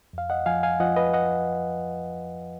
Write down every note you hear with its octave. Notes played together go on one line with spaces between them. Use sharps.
F2 F5
D#5 F#5
F3 F5 G#5
F5 G#5
F3 D#5 F#5
B4 D#5
D#5 F#5